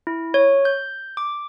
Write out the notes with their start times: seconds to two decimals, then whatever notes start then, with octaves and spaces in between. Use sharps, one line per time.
0.07 E4
0.34 C#5
0.65 G6
1.17 D6